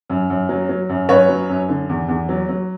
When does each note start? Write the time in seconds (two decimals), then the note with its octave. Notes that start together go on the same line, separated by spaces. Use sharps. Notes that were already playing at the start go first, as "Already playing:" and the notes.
0.10 F#2
0.30 F#2
0.49 F#3
0.69 F#3
0.89 F#2
1.09 F#2 B4 C#5
1.29 F#3
1.49 F#2
1.69 D3
1.89 E2
2.09 E2
2.29 F#3
2.49 F#3